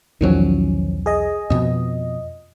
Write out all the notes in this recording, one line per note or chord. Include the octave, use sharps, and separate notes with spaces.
B1 E2 D#3 F3 F#3 C#4
G#4 D#5
F2 B2 D#5